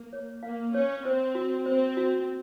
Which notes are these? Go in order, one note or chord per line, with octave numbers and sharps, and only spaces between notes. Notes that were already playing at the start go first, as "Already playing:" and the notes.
Already playing: A#3
C#5
A#3 F5
C#4 C#5
C4 C5
F#4
C4 C5
F#4